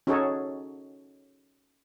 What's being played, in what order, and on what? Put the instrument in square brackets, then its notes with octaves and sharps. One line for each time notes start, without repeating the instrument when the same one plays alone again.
[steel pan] C#4 D#4 F#4 G#4 A4 C#5